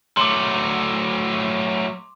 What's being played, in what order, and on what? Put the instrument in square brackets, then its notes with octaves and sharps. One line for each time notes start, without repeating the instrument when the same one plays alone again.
[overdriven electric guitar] F#3 A3 [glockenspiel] C6 D6